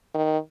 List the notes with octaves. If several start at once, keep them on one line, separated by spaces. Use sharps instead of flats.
D#3